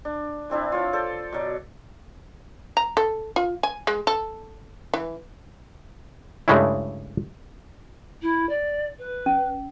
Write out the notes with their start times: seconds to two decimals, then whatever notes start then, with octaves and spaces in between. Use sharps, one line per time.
0.05 D4
0.50 E3 C4 D4 E4
0.72 F4 C#5
0.93 A4 C5 D5 A5
1.32 B2 F#3 D5
2.77 A#5
2.97 A4
3.36 F4
3.63 G#5
3.87 G#3
4.07 A4
4.94 E3
6.48 G2 C#3 G#3 A3 C#4 E4
8.22 E4
8.49 D5
8.99 B4
9.26 C#4